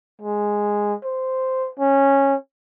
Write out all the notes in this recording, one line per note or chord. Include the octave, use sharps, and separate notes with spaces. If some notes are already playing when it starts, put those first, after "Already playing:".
G#3
C5
C#4